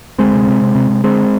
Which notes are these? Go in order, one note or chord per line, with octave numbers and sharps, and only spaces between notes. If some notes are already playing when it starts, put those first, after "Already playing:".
D2 G#3 C4
C3
C3
C3
C3
C3
D3 G#3 C4